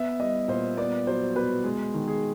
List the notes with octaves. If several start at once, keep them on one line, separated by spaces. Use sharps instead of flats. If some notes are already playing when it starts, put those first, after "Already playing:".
Already playing: B3 E5
G3 D#5
A#2 C5
B3 D5
F#3 C5
B2 B4
G#3
D#3
G#4